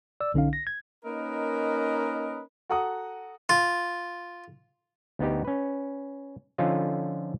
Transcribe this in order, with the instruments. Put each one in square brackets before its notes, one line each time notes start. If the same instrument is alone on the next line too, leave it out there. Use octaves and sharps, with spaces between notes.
[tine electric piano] D5 E6
B1 D3 C#4 D#4 F5
A#6
G#6
[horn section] A#3 C#4 D#4 A#4 B4 D#5
[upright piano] F#4 A4 F#5 A#5 D#6
[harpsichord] F4
[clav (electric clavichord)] D2 B3 D#4 G4
C#4 B4
D3 F3 C#4 D#4 F4 A4